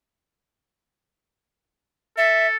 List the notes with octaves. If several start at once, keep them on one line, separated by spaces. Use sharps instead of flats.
A4 E5